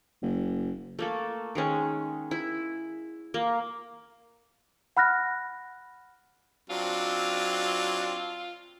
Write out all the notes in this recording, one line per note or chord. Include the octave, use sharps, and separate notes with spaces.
F#1
A3 A#3 A4
D#3 G#3 C#4
E4
A#3
F#5 B5 F6 F#6 A#6
F#3 C4 D4 F4